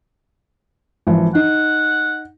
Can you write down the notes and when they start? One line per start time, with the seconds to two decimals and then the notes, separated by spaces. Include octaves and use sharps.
1.07 G#1 E3 F3
1.35 D#4 F#5